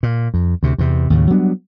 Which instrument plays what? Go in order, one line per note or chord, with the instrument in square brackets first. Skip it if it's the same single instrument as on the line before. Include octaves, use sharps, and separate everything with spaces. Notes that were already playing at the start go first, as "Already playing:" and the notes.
[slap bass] A#2
F2
D2 C3
E2 C3
D#2 A2 C#3
F#3 G3 B3 D4